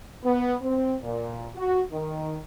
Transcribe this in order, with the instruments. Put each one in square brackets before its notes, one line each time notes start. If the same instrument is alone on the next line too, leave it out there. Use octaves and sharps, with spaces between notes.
[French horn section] B3
C4
A#2
F#4
D#3